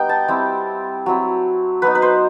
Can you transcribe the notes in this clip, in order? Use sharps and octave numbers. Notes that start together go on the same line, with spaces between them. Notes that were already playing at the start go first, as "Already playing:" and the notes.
Already playing: G3 B3 D#4 G5
A5
G3 C4 E4
F#3 C4 E4
F#3 B3 D#4 B4
B4
C5